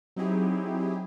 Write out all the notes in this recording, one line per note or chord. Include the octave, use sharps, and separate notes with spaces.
F#3 C4 D#4 E4 G4 G#4